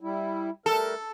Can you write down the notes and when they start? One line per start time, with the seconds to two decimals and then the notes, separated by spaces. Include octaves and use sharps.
0.01 G3 E4
0.66 G3 A3 A4 A#4